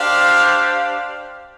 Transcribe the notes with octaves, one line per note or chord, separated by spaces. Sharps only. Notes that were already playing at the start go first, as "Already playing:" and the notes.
Already playing: D4 G4 C5 F5